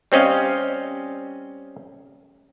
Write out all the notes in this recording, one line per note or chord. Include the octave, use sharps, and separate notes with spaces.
G3 C4 C#4 D#5 F5